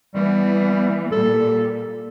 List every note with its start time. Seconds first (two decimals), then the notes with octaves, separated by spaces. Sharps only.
0.15 E3 G3 B3
1.12 A#2 G3 A4